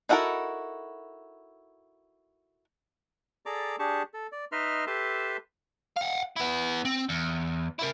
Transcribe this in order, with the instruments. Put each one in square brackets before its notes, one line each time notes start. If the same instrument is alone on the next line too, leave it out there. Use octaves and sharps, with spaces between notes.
[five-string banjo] D#4 E4 F#4 A4 A#4
[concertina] G#4 A4 D5 A#5 D6
D4 G4 G#4 A5 C#6
A4
D5
D#4 B4 D#5 E5 C6 F6
G4 A4 B4 E5 A5 C6
[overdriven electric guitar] F5 F#5
B3 E4
C4
E2
E4 A#4